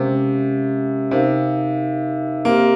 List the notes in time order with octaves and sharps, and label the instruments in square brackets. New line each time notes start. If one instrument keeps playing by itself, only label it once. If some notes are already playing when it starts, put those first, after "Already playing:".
Already playing: [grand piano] C3 [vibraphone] G#3 C#4 G4 A#4 F5
[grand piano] C3 [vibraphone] D#4 A#4 F5
[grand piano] A#3 [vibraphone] C4 G4 C5